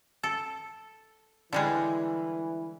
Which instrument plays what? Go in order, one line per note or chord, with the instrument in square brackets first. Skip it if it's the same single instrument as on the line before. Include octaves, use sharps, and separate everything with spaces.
[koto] A4
[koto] D3 G3 G#3 [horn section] E3